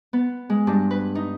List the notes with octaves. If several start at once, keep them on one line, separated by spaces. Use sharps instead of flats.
B3
G#3
G2
B4
D#4